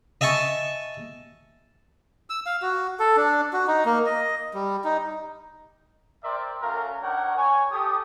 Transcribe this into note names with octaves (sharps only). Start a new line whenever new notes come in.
D#5 E5 G#5 A5 C#6
E6
F5
F#4
A4
D4
F#4
D#4
A#3
D#5
G3
D#4
A#4 C5 D5 E5 G5 C6
A3 C#4 F#4 A#4 F5
D4 D#4 A#4 C#5 F#5 G5
C#5 G#5
G4 A4 D#6